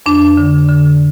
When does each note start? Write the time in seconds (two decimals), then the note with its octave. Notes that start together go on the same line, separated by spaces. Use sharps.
0.06 F2 D4
0.37 D3
0.69 D3